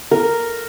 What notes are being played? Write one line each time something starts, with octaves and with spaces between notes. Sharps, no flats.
A#4